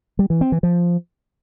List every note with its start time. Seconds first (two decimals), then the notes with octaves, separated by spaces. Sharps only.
0.19 G3
0.30 E3
0.41 C4
0.52 E3
0.63 F3